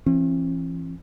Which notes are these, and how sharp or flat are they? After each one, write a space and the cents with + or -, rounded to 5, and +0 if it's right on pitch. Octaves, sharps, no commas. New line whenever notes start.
E3 +40 C4 +45